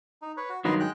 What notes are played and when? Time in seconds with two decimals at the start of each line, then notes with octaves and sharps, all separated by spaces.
0.22 D#4
0.37 B4 C#5
0.49 F#4
0.65 G2 D#3 F#3 B4 D#5 C6
0.80 G#3 G5 F#6